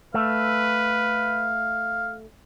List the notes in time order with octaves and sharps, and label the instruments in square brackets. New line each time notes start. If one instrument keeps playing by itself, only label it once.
[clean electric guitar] A3 [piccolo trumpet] B4 [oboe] F5